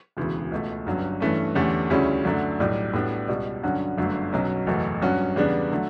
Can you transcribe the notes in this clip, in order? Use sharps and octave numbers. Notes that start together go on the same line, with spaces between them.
E1 D2 C#3 E3 B3
C#2 B2 A3
G1 G2 F#3 C#4
G2 E3 A3 C#4
E2 D3 A3 C#4 G4
D2 C#3 G3 C#4 E4
F#2 D3 F#3 A3 D4
B1 A2 G3 D4 G4
A2 G3 B3 D4 F#4
C#2 B2 G3
G2 D3 F#3 C#4 F#4
G1 F#2 D3 A3
B1 B2 F#3 C#4
F#1 E2 B2 A3
G2 F#3 C#4 F#4
E2 C#3 G3 B3 D4
D3 F#3 A3